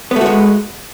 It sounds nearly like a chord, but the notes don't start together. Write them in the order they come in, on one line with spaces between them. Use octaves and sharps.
B3 A3 F#4 G#3